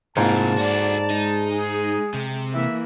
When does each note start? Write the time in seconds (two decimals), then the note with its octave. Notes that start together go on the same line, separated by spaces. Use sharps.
0.17 G#2 C3 A#3 E4 F4 A5
0.57 F#4 A4 D5
1.11 G#3 D#4
1.51 G#4
2.14 C3
2.53 E3 A#3 E5